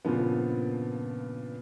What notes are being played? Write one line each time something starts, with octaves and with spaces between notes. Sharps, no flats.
G2 A#2 C#3 F3 B3